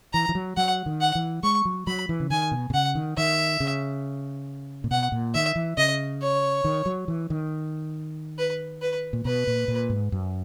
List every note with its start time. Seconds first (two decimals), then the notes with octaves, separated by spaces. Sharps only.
0.13 E3 A#5
0.29 E3
0.35 F#3
0.57 F#3 F#5
0.86 D#3
1.01 F#5
1.15 E3
1.43 G#3 C#6
1.65 F#3
1.87 F#3 B5
2.09 E3
2.20 C#3
2.30 D#3 G#5
2.52 B2
2.70 B2
2.74 C#3 F#5
2.95 D#3
3.17 D#3 E5
3.60 C#3
4.84 A#2
4.91 B2 F#5
5.12 A#2
5.34 D#3 E5
5.56 E3
5.77 C#3 D#5
6.21 C#5
6.65 D#3
6.86 F#3
7.08 E3
7.30 D#3
8.38 B4
8.82 B4
9.13 A#2
9.25 B2 B4
9.47 A#2
9.68 A#2
9.90 G#2
10.12 F#2